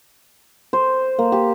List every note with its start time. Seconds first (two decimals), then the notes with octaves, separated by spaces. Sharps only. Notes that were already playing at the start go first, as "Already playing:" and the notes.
0.73 C5
1.19 A#3
1.32 G4